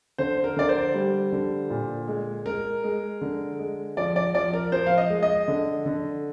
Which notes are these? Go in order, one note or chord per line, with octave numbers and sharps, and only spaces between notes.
D3 C5
A#4
D3 D5
C5
G3
D3
A#2
G#3
G#3 A#4
G#3
D3
G#3
F3 D5
D5
F3 D5
A#4
F3 C5
F5
D#5
G#3
D#5
D3
D3